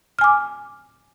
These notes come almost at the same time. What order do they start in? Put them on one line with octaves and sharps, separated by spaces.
F6 G#5 D6